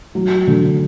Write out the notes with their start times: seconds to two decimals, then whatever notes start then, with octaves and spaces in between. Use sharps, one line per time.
0.15 F#3
0.47 D3